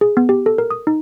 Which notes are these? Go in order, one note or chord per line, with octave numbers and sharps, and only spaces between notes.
G#4
B3
G4
A4
A#4
D#6
D#4